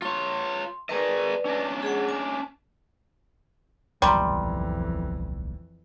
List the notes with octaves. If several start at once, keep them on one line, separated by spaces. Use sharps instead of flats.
F4 C#5 C6
G#4 A#4 B4 D5 D#5
C#4 D4 D#5
G#4 F#5
G#5
D1 B1 F2 A#2 E3 G3 A#5 C6